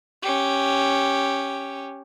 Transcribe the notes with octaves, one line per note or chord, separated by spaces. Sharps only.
C#4 G4